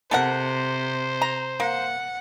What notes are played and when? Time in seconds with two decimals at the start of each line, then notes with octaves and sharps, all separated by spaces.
0.11 C3 A4 A#4 C5 F#5
1.22 A#5
1.60 A#3 F#5